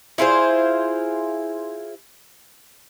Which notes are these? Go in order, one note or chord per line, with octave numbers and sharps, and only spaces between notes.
E4 F4 G#4 C5